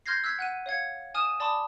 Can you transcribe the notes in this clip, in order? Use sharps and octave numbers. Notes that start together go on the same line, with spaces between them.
C6 F6 G6 G#6 A#6 C7
E6 F#6 G#6 B6
F#5 F#6 D#7
C#5 F5 G#6 C#7
G#5 D#6 F6 D#7 E7
D5 A5 B5 C6 D6 D#6